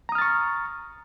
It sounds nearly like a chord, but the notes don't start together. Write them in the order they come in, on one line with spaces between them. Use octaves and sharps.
A#5 D#6 F6 A6 C#6